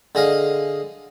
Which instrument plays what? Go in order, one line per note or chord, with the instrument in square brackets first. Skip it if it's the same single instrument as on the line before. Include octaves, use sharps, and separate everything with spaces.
[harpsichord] D3 G#4 D#5 F5